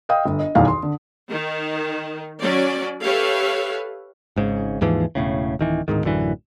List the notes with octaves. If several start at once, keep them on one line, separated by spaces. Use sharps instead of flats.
D#5 F5 G5 D#6
G1
D#5
B1 E2 D#3 F5
C6
D3
D#3
F#3 C#4 D5
G4 A4 B4 C#5 E5 F5
G#1 G#2 C#3
D#2 G#2 E3 F3
E1 A2 C#3
D1 D#3 E3
D1 B1 G#2 D#3
A1 F#2 D3 E3